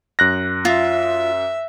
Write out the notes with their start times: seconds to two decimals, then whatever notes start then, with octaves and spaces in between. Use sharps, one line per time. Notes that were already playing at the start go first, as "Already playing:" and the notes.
0.19 F#2 F#6 A#6
0.65 F4 E5